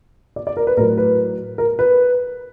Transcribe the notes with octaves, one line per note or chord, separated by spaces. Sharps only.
D5
D5
A#4
B4
A2 F#3 A#4
B4
A#4
B4